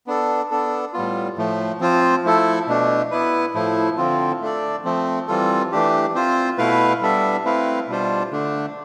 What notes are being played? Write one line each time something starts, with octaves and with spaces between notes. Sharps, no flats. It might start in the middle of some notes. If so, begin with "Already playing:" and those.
B3 D4 A4
B3 D4 A4
A2 G3 B3 F4
A2 F3 A3
F3 C4 F4 C5
F3 A3 E4 A4
B2 A3 D4
B3 E4 B4
A2 F3 A3 E4
D3 F3 C4 F4
A3 D4 A4 D5
F3 A3 C4
E3 G3 C4 F4 A4
E3 A3 D4 G4
C4 F4 C5
B2 A3 E4 B4 F5
G3 B3 D4 A4 E5
A3 C4 E4 B4 F5
B2 G3 D4 F4 C5
D3 A3 D4